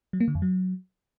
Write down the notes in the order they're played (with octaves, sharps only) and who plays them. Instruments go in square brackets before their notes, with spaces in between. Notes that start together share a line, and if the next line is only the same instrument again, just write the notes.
[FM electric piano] F#3
A#3
D3
F2
F#3